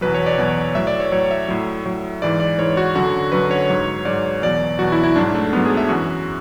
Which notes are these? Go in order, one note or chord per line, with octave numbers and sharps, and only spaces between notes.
E2 B2 F#3 B4
C#5
D5
E2 B2 F#3
A2 F#3 E5
D5
C#5
A2 F#3 C#5
E5
A2 F#3
A2 F#3
G#2 E3 D5
D5
G#2 E3 C#5
F#4
F#2 D3 F#3 F#4
F#2 D3 F#3 B4
C#5
G#2 F#3
G#2 F#3 D5
E2 B2 F#3 D5
E2 B2 F#3 F#4
E4
E4
G#2 F#3 D4
A3
G#2 F#3 B3
G#4
E5
F#2 E3 F#4